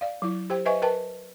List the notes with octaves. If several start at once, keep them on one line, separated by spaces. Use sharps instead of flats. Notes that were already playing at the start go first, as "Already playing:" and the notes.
D5 F5
F#3 E4
G4 C5 G5
B4 C5 D#5 E5 G#5 C#6
A#4 B4 G5 A5